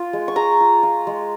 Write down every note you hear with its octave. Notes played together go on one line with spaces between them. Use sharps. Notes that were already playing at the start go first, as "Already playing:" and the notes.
Already playing: F4
G#3
C#6
G#3 A#5
F4
F4
G#3